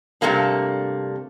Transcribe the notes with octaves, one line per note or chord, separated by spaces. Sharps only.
G2 C3 A3 A#3 D4